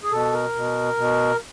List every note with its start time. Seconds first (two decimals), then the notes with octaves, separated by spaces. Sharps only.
0.03 G#4
0.11 B2 A4
0.33 A#4
0.55 B2
0.97 B2